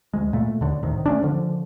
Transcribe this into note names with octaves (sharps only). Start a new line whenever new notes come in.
D2 G#3
A#2 A3
D#2 D3
C2 A2 C3 D#3
A3 C#4 D4
D3 F3